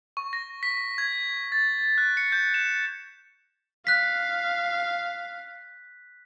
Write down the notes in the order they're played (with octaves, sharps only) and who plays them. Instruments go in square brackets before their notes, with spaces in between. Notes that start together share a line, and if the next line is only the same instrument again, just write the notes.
[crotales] C#6
A#6
B6
G#6
A6
F#6
C#7
G6
E7
[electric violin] F5 [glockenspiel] F#6 B6